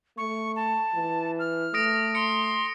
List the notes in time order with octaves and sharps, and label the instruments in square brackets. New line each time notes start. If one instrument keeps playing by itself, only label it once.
[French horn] A3 [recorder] C#6
[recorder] A5
[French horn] E3
[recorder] F6
[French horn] A3 [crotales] D#6 A#6 D7
[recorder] C6 [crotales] C#7